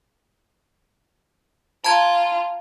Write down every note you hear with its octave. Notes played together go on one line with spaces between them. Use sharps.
F4 A5 A#5 G#6